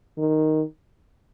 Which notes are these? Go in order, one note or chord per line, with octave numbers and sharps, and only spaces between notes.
D#3